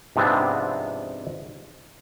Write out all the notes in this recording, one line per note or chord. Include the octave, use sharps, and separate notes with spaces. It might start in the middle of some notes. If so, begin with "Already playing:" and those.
G#2 C3 F3 B3 C4 D4